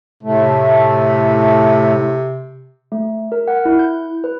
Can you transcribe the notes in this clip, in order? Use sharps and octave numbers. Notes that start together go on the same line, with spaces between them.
A2 C3 A3
A3
A#4
F#5
E4
G6
B4